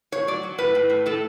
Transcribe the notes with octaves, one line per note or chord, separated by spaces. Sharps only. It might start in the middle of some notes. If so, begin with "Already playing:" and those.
A2 C#5
F#3 D5
F#3
A2 B4
A2
A2
A2 A4